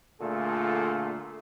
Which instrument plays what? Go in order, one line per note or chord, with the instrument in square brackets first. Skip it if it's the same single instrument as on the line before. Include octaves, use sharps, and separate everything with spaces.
[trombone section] A#2 D3 A3 F4 G#4 A4